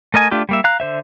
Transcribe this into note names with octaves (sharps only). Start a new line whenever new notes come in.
A3 A#4 D#5 G#5
A3 D4 F4 G4
G3 A#3 E5
F5 A#5 F#6
D3 C5 E5